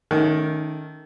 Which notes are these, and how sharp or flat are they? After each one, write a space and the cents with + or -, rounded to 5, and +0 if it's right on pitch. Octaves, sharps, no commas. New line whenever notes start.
D#3 +0 A3 -5 C#4 +30